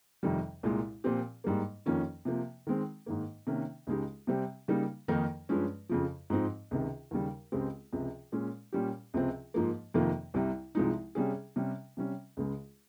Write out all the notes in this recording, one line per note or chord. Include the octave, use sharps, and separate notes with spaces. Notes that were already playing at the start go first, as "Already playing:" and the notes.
F2 C3 D#3 G3
C2 A#2 G#3
A#2 F3 C4 G4
G#2 G3 A#3
F2 D#3 A#3 C#4 F4
C3 F3 A#3
D#3 G#3 C4
G#2 D#3 A#3
C3 D#3 A#3 C#4
C#2 C#3 G#3 D#4 G4
C3 G3 C4 G4
C#3 G3 A#3 D#4
F2 D#3 A#3 D#4 A#4
G2 F3 G#3 C#4
F2 C#3 F3
G#2 F3 C4 D#4
C#2 C3 D#3
D#2 C#3 G3
C#2 C#3 G#3 C4 G4
C#2 C3 F3
A#2 G#3 C#4
A#2 G3 C#4 G4
C#2 C3 F3 C4
G#2 F3 A#3
F2 C3 D#3 A#3 F4
C2 C3 G3
C2 C3 F3 G#3 D#4
C3 G3 C#4 G#4
C3 G3 C#4
C3 G3 C#4
C#2 C#3 G#3